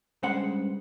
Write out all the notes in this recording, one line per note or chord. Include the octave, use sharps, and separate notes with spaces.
C#2 G2 C#3 G#3 C5 F#5